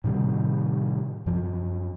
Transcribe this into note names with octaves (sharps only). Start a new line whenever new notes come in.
A2 C3 D#3 G3
F#2 F3